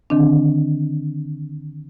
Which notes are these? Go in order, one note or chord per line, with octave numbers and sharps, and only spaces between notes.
D3 D#3 C4 D4